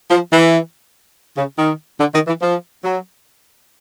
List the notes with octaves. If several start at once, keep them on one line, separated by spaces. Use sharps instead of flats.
F3
E3
C#3
D#3
D3
D#3
E3
F3
F#3